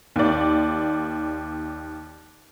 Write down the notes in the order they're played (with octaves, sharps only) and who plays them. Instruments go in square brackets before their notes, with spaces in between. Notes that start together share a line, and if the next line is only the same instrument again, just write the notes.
[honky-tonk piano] D#2 D5